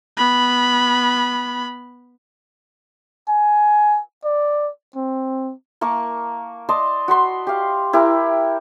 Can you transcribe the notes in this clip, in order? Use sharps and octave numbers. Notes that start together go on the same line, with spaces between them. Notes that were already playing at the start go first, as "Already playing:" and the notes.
B3 B5
G#5
D5
C4
A#3 A#4 A5 C#6
D5 D#5 A5 C6
F#4 B5 C6
G4 F5
E4 G4 A#4